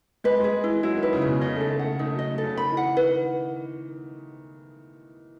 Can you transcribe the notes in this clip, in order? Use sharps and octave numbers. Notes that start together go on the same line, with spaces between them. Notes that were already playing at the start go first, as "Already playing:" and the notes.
G#3 B4
G#3 G#4
E4
E3
F#3 E4
D#3
B4
C#3
B2 G#4
C#3 D#5
A3 A4
A3
F#5
A3
A3 D#4
F#3 D#5
A4
C#3
D#3 B5
E3
F#5
E3
D#3 B4